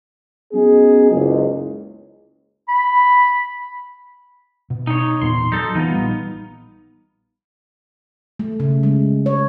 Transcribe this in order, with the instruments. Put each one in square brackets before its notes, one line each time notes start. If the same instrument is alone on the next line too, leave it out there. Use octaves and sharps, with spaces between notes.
[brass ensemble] F#3 B3 C#4 D#4 G#4
F#1 C#2
[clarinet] B5
[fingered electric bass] B2
[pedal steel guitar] D#4 C#5
[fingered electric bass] E2 A#2 B3 [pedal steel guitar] C6
[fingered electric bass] F#3 [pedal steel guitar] D#4 A4
[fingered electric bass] E3 F3 [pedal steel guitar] B3 D#4 F4
[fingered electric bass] A#1 G3
[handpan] A3
C#3
G#3
C#5